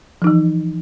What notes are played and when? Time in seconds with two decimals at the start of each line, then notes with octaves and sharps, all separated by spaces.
0.22 F3
0.24 D#4
0.27 E3